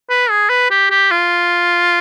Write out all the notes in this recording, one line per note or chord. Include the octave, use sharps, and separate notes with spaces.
B4
G#4
B4
G4
G4
F4